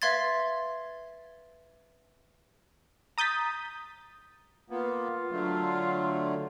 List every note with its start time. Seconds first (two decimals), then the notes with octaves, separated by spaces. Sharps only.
0.02 B4 E5 F5 C6 G#6 A6
3.18 A#5 D#6 G6 A6 B6
4.70 A#3 B3 F4
5.31 D3 F#3 A3